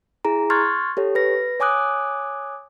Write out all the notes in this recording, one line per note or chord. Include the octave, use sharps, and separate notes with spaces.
E4 G#4 A#5
C6 C#6 F6 F#6 G#6 A6
G4 A4 C#5
B4 A#6
C#5 G#5 D6 D#6 F#6 G#6